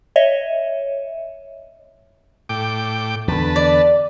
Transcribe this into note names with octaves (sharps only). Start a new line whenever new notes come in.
C#5 D#5 E5
A2 G5 D6
E2 D3 B4 A5
D5